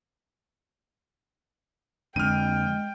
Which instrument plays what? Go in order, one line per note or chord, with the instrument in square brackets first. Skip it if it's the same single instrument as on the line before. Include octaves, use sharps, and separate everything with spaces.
[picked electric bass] F2 D3 [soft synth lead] G#3 [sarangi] G5 [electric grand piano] F6 D#7